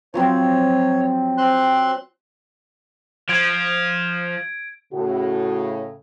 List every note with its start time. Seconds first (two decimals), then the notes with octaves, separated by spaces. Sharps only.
0.14 F3 F#3 C4 C#5
1.38 C4 C6 F#6
3.29 F3 G#6 D7
4.93 A2 C#3 F#4